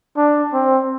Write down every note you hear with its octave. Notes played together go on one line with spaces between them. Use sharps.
D4
C4